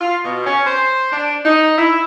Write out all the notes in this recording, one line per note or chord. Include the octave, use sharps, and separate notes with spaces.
F4
B2
C#4
C5
D4
D#4
E4